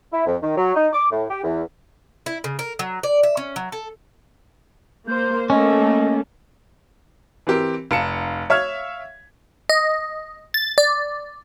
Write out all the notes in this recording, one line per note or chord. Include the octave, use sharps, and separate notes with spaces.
E4
F2
D#3
F#3
D#4
D6
A2
G4
E2
E4
C#3
A#4
F#3
D5
E5
C#4
F#3
A4
A#3 C5 G6
A3 A#3 C#4 A4 D#5
E3 C4 G4 A#4
F1 F5 A5 C#7 E7
C#5 E5 F5 F6 G#6
D#5
A6
D5